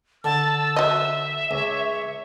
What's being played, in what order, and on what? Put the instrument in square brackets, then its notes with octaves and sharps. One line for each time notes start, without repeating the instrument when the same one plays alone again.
[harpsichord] D3 [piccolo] A5 [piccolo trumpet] E6
[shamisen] F#3 D#5 [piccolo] E5
[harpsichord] C#2 [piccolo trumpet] C#5